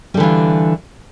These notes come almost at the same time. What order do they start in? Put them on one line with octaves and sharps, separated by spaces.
G3 D3 E3 F4